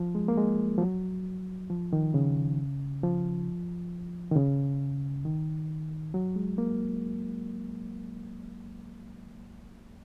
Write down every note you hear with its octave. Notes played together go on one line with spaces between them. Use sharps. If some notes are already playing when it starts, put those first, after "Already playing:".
Already playing: F3
G#3
A#3
G#3
F3
F#3
F3
D#3
C#3
F3
D#3
C#3
D#3
F#3
G#3
A#3